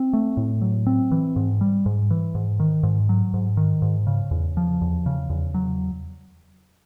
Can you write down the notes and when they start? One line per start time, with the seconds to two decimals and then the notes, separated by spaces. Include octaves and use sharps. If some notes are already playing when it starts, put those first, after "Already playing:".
Already playing: C4
0.13 A3
0.37 A2
0.61 F#3
0.87 C4
1.11 E3
1.36 G#2
1.61 G3
1.86 G#2
2.11 E3
2.35 G#2
2.60 D#3
2.83 G#2
3.09 F#3
3.34 G#2
3.57 D#3
3.82 G#2
4.07 C#3
4.31 E2
4.57 F3
4.82 E2
5.06 C#3
5.30 E2
5.54 F#3